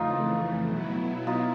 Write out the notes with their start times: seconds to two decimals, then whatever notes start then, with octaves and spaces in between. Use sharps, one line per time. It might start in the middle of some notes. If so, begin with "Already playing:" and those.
Already playing: F2 C#3 E3 A3 D#4 F4
0.66 B2 F#3 B3 E4
1.27 D#4 F4